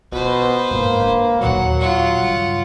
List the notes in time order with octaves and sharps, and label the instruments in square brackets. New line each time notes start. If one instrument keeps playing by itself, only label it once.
[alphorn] B2 [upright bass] F4 [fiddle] B4 C5
[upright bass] G#2 [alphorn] A#3
[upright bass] D4
[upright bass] D#2 A#2 [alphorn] F#3 [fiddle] F#5
[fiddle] F4 F#5
[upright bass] G2 C#3